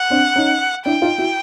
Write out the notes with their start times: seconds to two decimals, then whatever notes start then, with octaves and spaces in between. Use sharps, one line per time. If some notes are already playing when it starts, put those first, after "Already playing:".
Already playing: F#5
0.10 C4 D4
0.36 C#4 D#4
0.85 D4 E4 G5
1.02 D#4 F4
1.18 E4 F#4